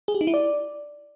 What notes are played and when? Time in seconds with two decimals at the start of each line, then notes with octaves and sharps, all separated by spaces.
0.08 G#4
0.14 G4
0.21 D#4
0.27 E4
0.34 D5